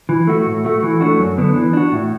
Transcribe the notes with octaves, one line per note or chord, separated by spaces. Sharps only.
E3
A3 F#4
A2
A3 F#4
E3
A3 D4 F#4
F#2
D3 B3 D4
E3
D4 F#4
A2